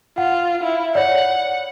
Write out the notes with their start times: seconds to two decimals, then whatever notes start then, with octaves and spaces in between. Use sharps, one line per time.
0.18 F4 F#5
0.63 E4
0.95 C#5 D5 F#5